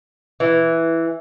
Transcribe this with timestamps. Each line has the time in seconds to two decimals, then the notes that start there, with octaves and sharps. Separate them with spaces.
0.40 E3